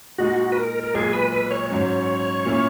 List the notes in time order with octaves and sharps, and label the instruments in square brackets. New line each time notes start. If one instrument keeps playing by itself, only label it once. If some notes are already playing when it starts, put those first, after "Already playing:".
[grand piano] A#2 G#3 D#4 [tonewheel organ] F#4
[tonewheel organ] B4
A#4
A#4
[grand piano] B1 A#2 G#3 [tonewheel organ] G#4
[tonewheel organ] B4
B4
C#5
[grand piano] G#2 F#3 C#4 [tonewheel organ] C#5
[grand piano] A#2 A#3 C#4 E4